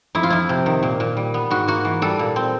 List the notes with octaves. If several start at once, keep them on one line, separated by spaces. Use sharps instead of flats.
F2 E4
F4
F2 E4
C3
D#3
A#2
A#2
G3
B3
G#2 F#4
A#3 F#4
E3
G3 A4
A#2
C4